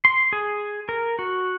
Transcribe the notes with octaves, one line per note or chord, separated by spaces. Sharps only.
C6
G#4
A#4
F#4